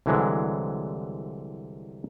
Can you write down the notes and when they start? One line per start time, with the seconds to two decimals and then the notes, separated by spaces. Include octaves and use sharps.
0.06 C2 D3 E3 F#3 G#3